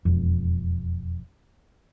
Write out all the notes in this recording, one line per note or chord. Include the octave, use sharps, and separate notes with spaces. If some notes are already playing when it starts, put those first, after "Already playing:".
E1 F2